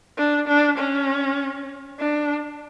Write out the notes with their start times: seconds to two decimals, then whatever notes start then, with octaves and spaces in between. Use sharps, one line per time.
0.18 D4
0.48 D4
0.78 C#4
1.99 D4